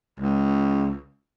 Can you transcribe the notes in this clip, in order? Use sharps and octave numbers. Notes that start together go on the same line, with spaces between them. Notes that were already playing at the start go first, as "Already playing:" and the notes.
C#2